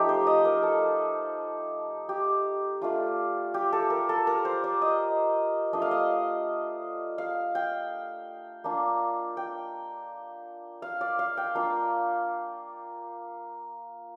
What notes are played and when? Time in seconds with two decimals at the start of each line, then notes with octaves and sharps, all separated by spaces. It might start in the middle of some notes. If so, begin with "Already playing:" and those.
Already playing: F3 A3 D#4 G4
0.09 C5
0.27 D#5
0.45 A#4
0.63 A4
2.09 G4
2.82 A3 D4 F4
3.54 G4
3.73 A4
3.90 A#4
4.09 A4
4.27 A#4
4.45 C5
4.64 D5
4.82 D#5
5.73 A3 D4 F4 D#5
5.82 F5
5.91 D#5
7.18 F5
7.55 G5
8.64 A#3 D4 F4
9.37 G5
10.82 F5
11.01 D5
11.19 F5
11.37 G5
11.55 A#3 D4 F4 F5